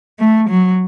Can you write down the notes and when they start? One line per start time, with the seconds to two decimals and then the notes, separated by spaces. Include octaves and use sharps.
0.19 A3
0.49 F#3